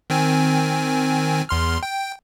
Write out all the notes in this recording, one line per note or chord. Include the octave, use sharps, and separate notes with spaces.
D#3 C4 G#5
E2 C6 F6
G5